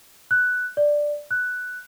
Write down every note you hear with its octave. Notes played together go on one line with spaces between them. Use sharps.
F#6
D5
F#6